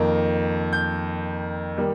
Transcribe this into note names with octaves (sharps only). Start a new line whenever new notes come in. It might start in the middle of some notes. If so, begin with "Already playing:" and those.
Already playing: F2 D#3 A#3
G6
D#3 G3 A#3